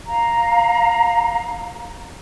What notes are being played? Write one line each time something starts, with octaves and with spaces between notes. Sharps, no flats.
F5 A#5